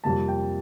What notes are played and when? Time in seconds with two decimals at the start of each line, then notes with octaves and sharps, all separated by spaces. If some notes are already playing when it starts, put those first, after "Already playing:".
0.04 F2 C3 G3 A#3 A5
0.28 G5